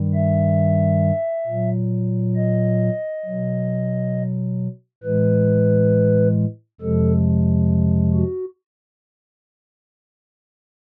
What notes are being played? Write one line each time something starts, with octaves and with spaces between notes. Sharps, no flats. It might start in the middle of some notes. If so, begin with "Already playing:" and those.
Already playing: G2 D#3 G3
E5
A#2 F#3
D#5
B2 F#3
A2 E3 G#3 B4
F2 C3 F3 G#3 A4
F#4